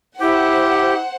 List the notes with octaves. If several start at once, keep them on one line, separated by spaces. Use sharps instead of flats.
E4 G4 C5 F#5